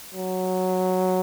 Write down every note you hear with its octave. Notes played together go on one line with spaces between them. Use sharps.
F#3